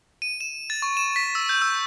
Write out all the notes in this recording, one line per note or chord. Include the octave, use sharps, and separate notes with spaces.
D#7
E7
A6
C#6
E7
B6
E6
G6
E6